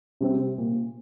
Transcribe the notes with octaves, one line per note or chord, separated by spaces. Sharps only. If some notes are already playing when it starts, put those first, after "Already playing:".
C3 G3 C4 G4
A#2